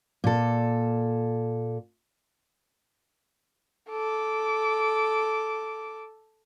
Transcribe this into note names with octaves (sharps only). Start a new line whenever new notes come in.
A#2 A4
A4 D6